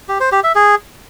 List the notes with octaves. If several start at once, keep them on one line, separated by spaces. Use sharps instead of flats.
G4
C5
G4
E5
G#4